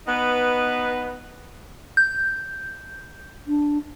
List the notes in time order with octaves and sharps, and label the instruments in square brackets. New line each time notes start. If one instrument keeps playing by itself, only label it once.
[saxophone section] B3 D#4 B4
[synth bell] G6
[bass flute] D4